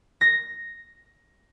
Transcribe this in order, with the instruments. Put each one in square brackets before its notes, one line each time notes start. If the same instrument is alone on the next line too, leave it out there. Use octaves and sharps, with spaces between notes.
[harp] A#6